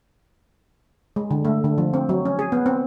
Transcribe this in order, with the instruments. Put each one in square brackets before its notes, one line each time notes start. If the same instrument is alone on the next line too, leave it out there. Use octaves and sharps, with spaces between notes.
[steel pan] G#3
D3
A3
D3
F3
C4
F#3
C#4
G#4
B3
C4